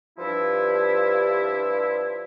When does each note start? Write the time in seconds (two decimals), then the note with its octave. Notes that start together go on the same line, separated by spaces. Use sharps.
0.18 G2 F3 E4